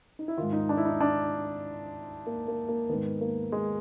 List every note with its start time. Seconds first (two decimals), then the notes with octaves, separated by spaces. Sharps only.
0.19 D#4
0.28 E4
0.38 G#2 D#3 F4
0.53 D#4
0.69 D4
0.77 E4
0.85 D#4
1.01 D4
2.27 A#3
2.48 A#3
2.68 A#3
2.89 G#2 D#3 B3
3.21 A#3
3.52 G#3